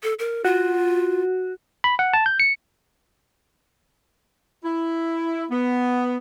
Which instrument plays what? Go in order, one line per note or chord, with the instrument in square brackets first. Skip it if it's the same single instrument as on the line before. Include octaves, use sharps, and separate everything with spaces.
[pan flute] A4
A#4
[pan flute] F4 [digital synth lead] F#4
[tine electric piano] B5
F#5
A5
G6
C#7
[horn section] E4
B3